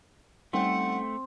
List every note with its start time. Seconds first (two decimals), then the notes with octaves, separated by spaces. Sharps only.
0.53 G3 A3 C4 C#4 D#4 F#5